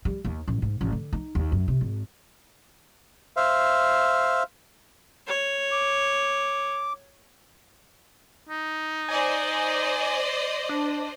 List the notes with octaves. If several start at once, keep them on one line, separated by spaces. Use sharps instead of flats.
G3
D#2
A1
G#2
A1
D3
D#4
D#2
F#2
C3
G#1
C5 E5 F5
C#5
D6
D#4
C5 D5 D#5 G#5
D4